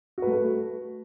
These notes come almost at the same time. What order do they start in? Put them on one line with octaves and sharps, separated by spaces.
F#4 B4 A3